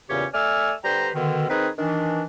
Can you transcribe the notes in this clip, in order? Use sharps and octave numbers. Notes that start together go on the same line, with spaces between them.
E2 A#2 C#3 C#4 G4 C#5
A3 D5 G#5 E6 F6
D3 G3 B4 C5 G5 A#5
B2 D3 D#3
D#3 C4 D#4 G#4 B4
D#3 E3 D4